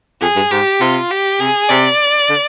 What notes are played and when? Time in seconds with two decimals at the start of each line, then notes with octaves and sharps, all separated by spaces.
0.21 F2 G#4
0.36 G2
0.51 G#2 G4
0.80 C3 F4
1.11 G4
1.40 C3 G#4
1.69 C3 D5
2.30 D3